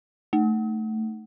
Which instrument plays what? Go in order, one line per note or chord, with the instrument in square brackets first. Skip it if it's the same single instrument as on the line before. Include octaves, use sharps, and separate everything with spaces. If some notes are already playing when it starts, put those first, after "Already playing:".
[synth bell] A3